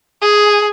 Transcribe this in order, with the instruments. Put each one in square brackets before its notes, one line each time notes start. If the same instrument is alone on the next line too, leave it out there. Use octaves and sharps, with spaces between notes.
[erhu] G#4